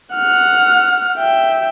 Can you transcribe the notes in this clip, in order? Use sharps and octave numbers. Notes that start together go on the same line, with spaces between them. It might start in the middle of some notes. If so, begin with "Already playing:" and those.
F#5 F6
E5 G5